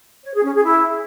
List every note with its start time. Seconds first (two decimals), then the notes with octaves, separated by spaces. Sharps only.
0.24 C#5
0.34 G#4
0.44 C#4
0.54 G#4
0.64 E4